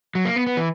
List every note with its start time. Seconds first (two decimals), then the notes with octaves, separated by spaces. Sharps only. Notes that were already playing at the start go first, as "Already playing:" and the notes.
0.15 F#3
0.25 A#3
0.36 B3
0.46 B3
0.57 E3